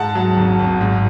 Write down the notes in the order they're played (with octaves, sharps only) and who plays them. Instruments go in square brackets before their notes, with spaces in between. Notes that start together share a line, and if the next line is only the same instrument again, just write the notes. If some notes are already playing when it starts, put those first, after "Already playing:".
Already playing: [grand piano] G#2 F#5 A5
F#3
G#1
G#1
G#2